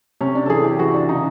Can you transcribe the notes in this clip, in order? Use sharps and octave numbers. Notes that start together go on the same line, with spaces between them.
C3 C#4
D4
A4
E3 G#4
G4
E3 F#4
D4
C#3 D#4